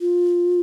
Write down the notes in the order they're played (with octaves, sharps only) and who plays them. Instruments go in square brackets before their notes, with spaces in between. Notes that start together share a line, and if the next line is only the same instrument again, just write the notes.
[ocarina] F4